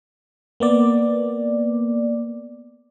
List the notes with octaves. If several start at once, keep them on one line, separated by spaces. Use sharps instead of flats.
A#3 B3 D5